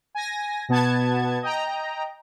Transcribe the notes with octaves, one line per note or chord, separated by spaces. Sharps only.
G#5 A#6
B2 B3 A5 G#6
D#5 G5 A#5